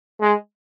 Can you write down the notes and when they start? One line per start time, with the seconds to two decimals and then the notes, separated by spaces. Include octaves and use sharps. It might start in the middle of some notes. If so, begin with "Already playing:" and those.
0.21 G#3